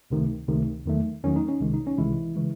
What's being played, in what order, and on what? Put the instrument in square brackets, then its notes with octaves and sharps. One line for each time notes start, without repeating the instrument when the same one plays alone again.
[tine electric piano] C#2 C3 D#3 A3
C#2 C3 D#3 A3
E2 D#3 F#3 A3
E2 D#3 F#3 A3 C#4
D#4
C#4
C2 C3 D#3 G#3
D#4
C#4
C2 C3 D#3 E3 G#3 E4
C#3 E3 G#3